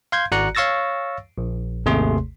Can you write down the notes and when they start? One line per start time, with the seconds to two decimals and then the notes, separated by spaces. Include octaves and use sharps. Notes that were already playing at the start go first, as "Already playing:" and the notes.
0.12 F5 C6 G6 G#6
0.32 G#1 F#4 D5 A#5 F#6 C#7
0.55 C#5 F5 C#6 E6 A6 A#6
1.38 A#1
1.86 G#1 D#2 C3 A3 G#4 C6